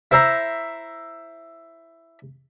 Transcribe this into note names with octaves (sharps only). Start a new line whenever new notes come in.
E4 C5 E5 A#5